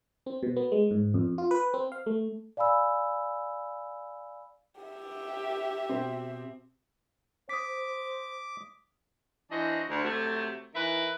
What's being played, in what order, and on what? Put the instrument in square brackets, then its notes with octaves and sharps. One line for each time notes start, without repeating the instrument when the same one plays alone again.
[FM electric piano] C4
B2
B3
G#3
G#2
F2
F4
B4
C4
F5
A3
[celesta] D5 F5 G#5 B5 E6
[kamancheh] G4 E5
[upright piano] B2 C4
[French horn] C5 [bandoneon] D6 [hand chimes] D#6 B6
[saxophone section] E3 D4 F#4 C5 D#5
D2
C3 F#3 A3
E3 D#4 A#4 B4 E5